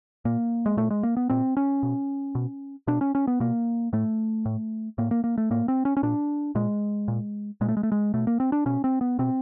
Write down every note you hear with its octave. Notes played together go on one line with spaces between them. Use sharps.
A#2 A#3
G#3
A#2 A3
G#3
A#3
B3
A#2 C4
C#4
B2
B2
B2 D4
C#4
C#4
B3
B2 A#3
A2 A3
A2
A2 A#3
A#3
A#3
A3
A2 A#3
C4
C#4
C#4
A#2 D4
A#2 G#3
A#2
A#2 G#3
A3
G#3
A3
G#3
B2 A3
A#3
C4
D4
B2 C#4
C4
B3
B2 C4